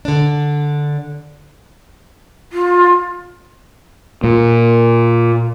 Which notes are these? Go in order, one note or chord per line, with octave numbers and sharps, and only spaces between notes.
D3 D4
F4
A#2